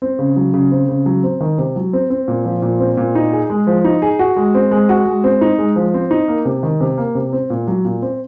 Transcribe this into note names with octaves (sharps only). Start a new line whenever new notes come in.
C4
C#3
F#3
C#3
C4
C#3
F#3
C4
D#3
C3
F#3
C4
C4
A#2
F3
A#2
C4
A#2
D#4
G#4
G#3
F3
D#4
G#4
F#4
G#3
C4
G#3
F#4
G#3
C4
D#4
G#3
F3
C4
D#4
A#3
C3
D#3
C3
A#3
C3
C4
A#2
F#3
A#2
C4